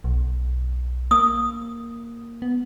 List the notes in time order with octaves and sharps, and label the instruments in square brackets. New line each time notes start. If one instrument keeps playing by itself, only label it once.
[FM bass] B1
[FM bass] A#3 [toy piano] D#6
[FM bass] B3